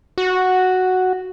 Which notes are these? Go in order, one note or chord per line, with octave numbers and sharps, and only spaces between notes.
F#4